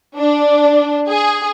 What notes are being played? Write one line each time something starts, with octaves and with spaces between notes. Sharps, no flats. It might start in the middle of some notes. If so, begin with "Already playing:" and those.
D4
G#4